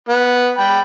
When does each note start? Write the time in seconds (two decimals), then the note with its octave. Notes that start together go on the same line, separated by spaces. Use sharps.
0.09 B3
0.58 G5 B5